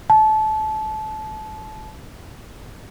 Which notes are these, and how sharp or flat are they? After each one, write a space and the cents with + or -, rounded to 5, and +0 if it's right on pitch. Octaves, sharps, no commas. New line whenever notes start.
A5 -25